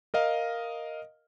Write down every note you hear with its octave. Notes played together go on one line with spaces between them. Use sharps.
A#4 D#5 F5